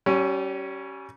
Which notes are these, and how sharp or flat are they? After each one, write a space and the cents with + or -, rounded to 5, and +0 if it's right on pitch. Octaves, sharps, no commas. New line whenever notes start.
G3 -35 C#4 +0